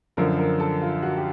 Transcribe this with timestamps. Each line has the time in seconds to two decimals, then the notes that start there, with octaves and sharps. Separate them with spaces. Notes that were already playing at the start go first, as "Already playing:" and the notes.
0.17 F#2 D3 F3 A#4
0.39 A#4
0.60 A4
0.82 F4
1.02 F#4
1.16 G4